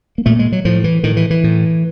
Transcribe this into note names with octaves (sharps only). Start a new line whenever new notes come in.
A#3
A#2 A3
G#3
F#3
A2 F3
E3
A2 D#3
E3
E3
A2